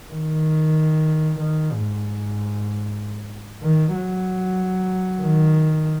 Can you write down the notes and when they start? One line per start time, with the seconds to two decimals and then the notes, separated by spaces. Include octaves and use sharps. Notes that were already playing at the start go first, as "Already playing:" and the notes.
0.13 D#3
1.40 D#3
1.73 G#2
3.63 D#3
3.95 F#3
5.22 D#3